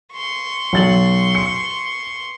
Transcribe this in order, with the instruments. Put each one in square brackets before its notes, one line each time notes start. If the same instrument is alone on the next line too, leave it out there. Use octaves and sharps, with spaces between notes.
[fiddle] C6 C#6
[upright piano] B1 A6 F#7
C#7